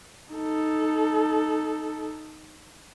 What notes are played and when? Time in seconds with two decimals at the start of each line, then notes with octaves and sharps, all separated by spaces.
0.34 D#4 A4